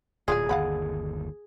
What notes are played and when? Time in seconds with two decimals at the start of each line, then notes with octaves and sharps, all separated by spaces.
0.28 D1 A#2 F4 G#4 D5 G#5
0.49 G1 D#2 D3 F5 F#5 B5